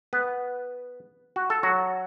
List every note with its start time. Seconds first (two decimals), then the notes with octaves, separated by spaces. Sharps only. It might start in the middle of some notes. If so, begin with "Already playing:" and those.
0.13 B3 B4
1.36 F#4
1.50 A4
1.63 F#3 F#4